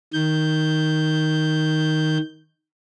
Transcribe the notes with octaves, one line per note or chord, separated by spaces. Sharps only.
D#3 G6